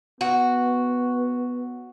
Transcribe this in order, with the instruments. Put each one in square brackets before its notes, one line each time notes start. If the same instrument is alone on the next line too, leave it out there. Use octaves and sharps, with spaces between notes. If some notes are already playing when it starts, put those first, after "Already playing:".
[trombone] B3 [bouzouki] F#4